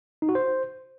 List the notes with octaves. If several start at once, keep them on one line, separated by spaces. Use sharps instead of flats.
D#4
F#4
C5